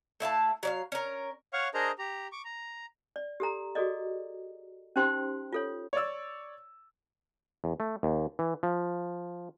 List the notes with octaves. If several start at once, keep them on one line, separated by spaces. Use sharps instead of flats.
A3 E4 F5 A5
F#3 D5 F5
C#4 A#4
C#5 F5 F#5 C#6 F6
D4 G#4 A#4 C5 D#5 A#5
G4 A#5
C#6 D6
A#5
D5
G4 A4 A#5
F#4 G#4 A4 D5 D#5
C#4 D#4 G4 C5 G5 C6
F4 A4 C#5
C#5 D5 E6
E2
A3
D#2
E3
F3